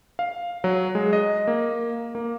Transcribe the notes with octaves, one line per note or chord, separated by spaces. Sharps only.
F5
F#3
G#3
D#5
A#3
A#3